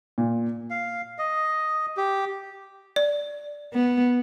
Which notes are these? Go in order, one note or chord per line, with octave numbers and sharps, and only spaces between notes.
A#2
F5
D#5
G4
D5
B3